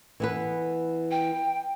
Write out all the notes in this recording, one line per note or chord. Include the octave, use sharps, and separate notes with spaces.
E3 B3 B4
G5